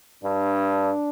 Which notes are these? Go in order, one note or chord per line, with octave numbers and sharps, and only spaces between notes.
G2 D4